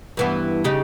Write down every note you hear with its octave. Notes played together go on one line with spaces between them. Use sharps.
G2 E3 B3
C#3 D#4 G4